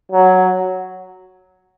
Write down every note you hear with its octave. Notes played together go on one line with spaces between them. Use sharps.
F#3